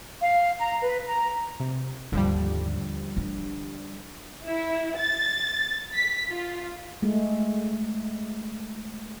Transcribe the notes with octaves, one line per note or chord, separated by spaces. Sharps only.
F5
A#5
B4
A#5
C3
D#2 G#2 D3 F3 G3
D4
E4
A6
B6
F4
G#3 A3